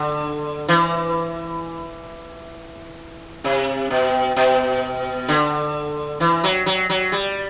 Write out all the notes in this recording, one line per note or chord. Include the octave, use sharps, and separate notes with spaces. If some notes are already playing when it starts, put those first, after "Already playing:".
Already playing: D3
E3
C3
B2
B2
D3
E3
F#3
F#3
F#3
G3